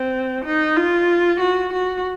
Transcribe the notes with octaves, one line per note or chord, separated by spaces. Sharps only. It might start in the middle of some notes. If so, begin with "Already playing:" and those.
Already playing: C4
D#4
F4
F#4
F#4